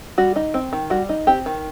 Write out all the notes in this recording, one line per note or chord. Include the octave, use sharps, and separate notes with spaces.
G3 F#4
D#4
C4
D#3
G3 F#4
D#4
C4 G4
D#3